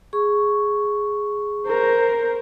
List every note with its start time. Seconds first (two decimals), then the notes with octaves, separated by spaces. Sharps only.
0.13 G#4 C#6
1.67 A#4 C5